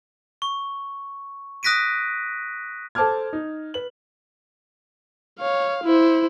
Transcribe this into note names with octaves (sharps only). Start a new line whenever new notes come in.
C#6
D#6 F#6 A#6 B6 D7 D#7
A4 C5 A5 D6 F6 G#6
D#4
B4 F#7
C#5 F5
E4 C5